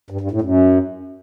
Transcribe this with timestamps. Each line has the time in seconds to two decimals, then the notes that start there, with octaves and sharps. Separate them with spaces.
0.10 G2
0.21 G2
0.31 A2
0.42 F#2